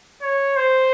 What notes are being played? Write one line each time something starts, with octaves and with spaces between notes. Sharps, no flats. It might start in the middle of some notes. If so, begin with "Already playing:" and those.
C#5
C5